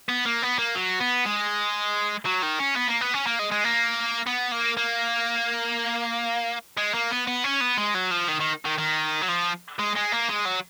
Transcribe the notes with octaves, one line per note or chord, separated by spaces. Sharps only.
B3
A#3
B3
A#3
F#3
B3
G#3
F#3
D#3
C#4
B3
A#3
B3
C#4
A#3
G#3
G#3
A#3
B3
A#3
A#3
G#3
A#3
B3
B3
C#4
B3
G#3
F#3
F3
D#3
D#3
D#3
D#3
F#3
F3
G#3
G#3
A#3
G#3
F#3